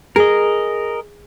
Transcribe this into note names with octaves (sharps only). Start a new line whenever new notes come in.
G#4 A#4 D#5